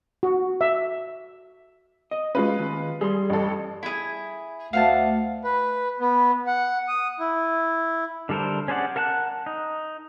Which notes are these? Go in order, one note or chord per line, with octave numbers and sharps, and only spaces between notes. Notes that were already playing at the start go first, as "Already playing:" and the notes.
F#4
E5
D#5
G#3 C#4 F4 F#4 B4
D#2
G3 G#4 C6
A1 A4
E4 G#4
D2 F5 F#5 A5
B4
B3
F#5
D#6
E4
D3 G3 A4 A#4 C5
C#4 G#4 C5 D5 F#5
A#4 F#5 A5 A#5 F#6
D#4